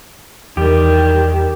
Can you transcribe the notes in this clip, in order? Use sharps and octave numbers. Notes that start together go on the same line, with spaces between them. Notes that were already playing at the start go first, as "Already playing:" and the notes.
E2 D#3 G3 G4